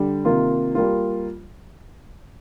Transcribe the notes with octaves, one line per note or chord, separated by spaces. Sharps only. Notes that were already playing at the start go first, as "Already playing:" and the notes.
Already playing: D3 G3
C3 D#3 A#3 F4
G3 A#3 F4